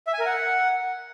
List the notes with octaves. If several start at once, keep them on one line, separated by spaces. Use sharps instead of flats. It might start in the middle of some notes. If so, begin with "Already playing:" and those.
E5
G#5
A#4
F#5